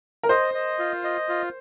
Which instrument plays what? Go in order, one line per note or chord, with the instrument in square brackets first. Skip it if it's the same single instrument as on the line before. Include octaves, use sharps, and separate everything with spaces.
[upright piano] A#4
[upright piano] C5 [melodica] D#5
[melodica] D#5
F4
D#5
F4